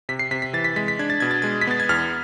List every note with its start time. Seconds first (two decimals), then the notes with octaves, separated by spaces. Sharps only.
0.09 C3 B6
0.19 C7
0.31 C3 B6
0.42 B6
0.53 E3 A6
0.64 B6
0.76 G#3 B6
0.88 B6
0.99 D4 G#6
1.10 A6
1.20 B2 G#6
1.31 A6
1.42 G#3 G#6
1.61 B6
1.67 B3 A6
1.80 G#6
1.89 E2 F6